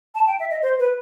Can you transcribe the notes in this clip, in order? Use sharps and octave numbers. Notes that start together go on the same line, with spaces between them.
A5
G5
E5
D#5
C5
B4